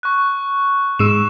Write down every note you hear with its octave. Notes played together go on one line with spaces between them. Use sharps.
C#6 F#6
G#2 G#3 E6 E7